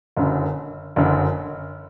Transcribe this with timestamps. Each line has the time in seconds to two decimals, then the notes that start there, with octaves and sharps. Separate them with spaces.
0.17 F#1 F#2 D3
0.96 F#1 F#2 D3